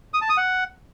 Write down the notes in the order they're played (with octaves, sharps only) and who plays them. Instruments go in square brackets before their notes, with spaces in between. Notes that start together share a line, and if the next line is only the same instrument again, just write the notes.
[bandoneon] D#6
A5
D#6
F#5